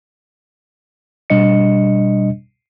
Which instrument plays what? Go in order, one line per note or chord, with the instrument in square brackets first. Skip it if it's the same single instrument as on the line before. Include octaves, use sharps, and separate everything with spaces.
[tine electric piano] B2 G3 D4 D#5 C#7